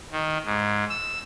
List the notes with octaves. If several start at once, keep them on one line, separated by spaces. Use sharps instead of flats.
D#3
G#2
E6